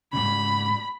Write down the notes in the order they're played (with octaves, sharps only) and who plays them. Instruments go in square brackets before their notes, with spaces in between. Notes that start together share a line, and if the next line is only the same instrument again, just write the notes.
[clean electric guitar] G#2 C#3 [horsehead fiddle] B5